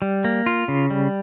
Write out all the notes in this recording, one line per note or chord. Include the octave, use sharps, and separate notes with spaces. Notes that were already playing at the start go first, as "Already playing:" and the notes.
G3
A#3
F4
C#3
G3